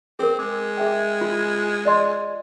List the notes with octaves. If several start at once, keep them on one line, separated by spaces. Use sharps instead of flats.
C4 G#4 A#4
G#3 D6
G#4 E5 G5
F4
D5 D#5 C6